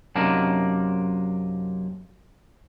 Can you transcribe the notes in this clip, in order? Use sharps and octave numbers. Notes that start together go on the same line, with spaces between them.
F#2 C3 A#3 D4 D#4